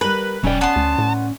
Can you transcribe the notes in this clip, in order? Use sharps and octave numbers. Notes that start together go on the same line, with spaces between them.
G3 A#4 B4
E1 F#3 C#4 D5 G5
B3 A5 C6
D2
A2